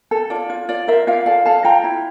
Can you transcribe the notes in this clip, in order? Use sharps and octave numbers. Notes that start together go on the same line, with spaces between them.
A4
F4 D5
F4
F4 D5
A#4 C5 E5
F4 D5 F5
A4 D5 F5
A4 F5 A5
F4 G5 A#5
E4